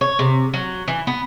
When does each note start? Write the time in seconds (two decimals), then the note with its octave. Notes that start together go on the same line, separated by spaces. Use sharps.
0.01 C#5
0.19 C3
0.54 F#3
0.88 E3
1.07 B3